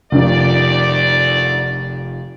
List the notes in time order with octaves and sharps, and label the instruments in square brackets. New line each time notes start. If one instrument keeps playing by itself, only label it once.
[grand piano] F1 D#3 F3 [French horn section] D2 D5